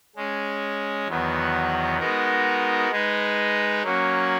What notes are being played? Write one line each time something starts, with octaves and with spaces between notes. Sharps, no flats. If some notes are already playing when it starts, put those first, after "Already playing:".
G#3 C#4 G#4
E2 D#3 F#3 B3 F#4
G#3 B3 D#4 F#4 A#4
G#3 D#4 G#4 B4
F#3 A#3 C#4 F#4